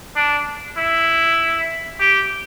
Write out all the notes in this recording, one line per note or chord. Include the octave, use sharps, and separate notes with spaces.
D4
E4
G4